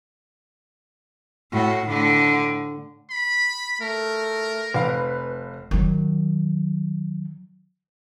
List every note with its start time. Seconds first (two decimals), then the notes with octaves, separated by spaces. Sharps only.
1.52 A2 F#4
1.86 A2 D3
3.10 B5
3.81 A3 A#4
4.74 F1 B4 F5
5.71 D#3 F#3